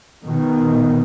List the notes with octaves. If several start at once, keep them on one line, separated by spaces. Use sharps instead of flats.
B2 D#3